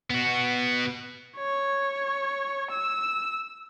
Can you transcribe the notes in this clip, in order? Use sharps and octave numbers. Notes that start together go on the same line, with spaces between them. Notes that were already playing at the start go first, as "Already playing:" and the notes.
B3 F#4
C#5
E6